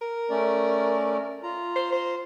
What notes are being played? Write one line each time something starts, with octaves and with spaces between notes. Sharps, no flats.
A#4
A3 C#4 D5
F4 A#5
C5
C5